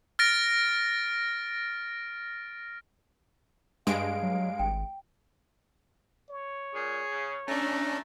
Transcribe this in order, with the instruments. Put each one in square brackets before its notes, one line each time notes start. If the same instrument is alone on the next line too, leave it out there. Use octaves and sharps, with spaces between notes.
[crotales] F6 A6 A#6 D7
[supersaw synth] G2 G#3 D7 [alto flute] F5
[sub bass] F#3
[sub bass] G#1 [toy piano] G5
[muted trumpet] C#5
[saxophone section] A#2 [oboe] G#4
[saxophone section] C#3
[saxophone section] A3 [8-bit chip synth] C#4 D4 [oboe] A#5